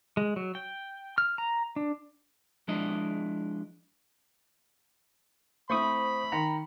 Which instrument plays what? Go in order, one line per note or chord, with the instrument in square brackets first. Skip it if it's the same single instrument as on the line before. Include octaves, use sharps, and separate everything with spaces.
[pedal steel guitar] G#3
F#3
G5
F6
A#5
D4
[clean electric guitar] F3 G#3 D4 E4 D#5
[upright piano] A3 C4 E4 [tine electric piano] C5 C#6 D#6 [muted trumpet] B5
[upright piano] D#3 C6 C#7 [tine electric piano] A#5